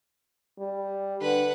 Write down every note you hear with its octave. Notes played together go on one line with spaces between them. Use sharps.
G3
D3 B4 F#5